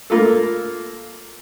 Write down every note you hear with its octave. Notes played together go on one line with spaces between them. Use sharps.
A#3 F4 A4